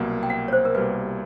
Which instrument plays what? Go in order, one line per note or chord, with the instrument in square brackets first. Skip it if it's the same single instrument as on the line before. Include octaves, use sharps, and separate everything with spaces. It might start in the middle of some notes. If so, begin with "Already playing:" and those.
Already playing: [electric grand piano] C2 B2 F#3 A#3
[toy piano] G5
F#5
C#5
C5
A#4
[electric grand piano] C2 B2 G3 A#3 [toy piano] B4